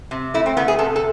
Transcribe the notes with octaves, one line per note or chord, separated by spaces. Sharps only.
C3
A3 E4
C4
A3 B3
G#4
C3 A4
A4